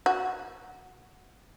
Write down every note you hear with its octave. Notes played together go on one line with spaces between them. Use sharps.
F#4